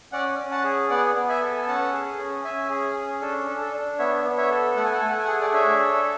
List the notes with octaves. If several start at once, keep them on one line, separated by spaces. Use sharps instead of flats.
C#4 D5 F#5
C#4
F#5 A5
G#4
B3 D5 F#5
B3
E5 G#5
A4
G#5
C#4 F#5 A5
G#4
C#4
C#4 E5 G#5
G#4
C#4
D4 A4
A4
A4
D4
B3 C#5 E5
B3
C#5 E5
A4
A3 F#5
G#5
F#5
A3 G#5
F#5
G#5
G#4 F#5
G#5
D5 F#5
D4 C#5 E5
A4